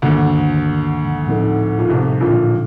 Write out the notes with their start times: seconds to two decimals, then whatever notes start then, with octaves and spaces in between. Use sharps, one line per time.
0.02 D2 G2 D3 D#3 A#3
1.27 A2 F3 C4 D#4 A4
1.79 A#2
1.89 C2 C3
2.20 A#1 A#2